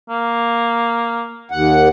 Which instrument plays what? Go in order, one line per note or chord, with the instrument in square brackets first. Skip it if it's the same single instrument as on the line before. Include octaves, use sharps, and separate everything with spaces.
[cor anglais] A#3
[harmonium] D#2 F#5